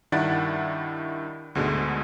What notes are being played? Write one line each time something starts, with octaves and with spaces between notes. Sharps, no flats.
G2 D#3 D4 E4 F#5 A6
D2 G#2 B2 D3 G#3 A3